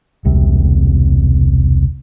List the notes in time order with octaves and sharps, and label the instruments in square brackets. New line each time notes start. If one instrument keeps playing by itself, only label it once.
[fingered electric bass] E1 C2 C3